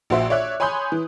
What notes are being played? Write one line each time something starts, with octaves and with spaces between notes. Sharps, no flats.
A#1 F#4 C5 E5
C#5 D5 E5 F#6
C#5 G#5 B5 C6 D#6 G6
E3